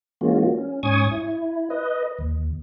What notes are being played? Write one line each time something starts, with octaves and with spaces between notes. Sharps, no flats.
E3 G#3 A#3 C#4 F4 F#4
C#4
G#2 C#4 G#5 C#6 D#6 G#6
E4
B4 D#5
D#2